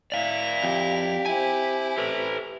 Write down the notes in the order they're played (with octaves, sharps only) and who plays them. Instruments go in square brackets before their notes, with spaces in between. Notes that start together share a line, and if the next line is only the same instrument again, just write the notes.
[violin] E4 F7 [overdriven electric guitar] D5 F5
[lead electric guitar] F2 [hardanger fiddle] G4
[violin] C4 E4 [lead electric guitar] G#5
[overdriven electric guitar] A4 B4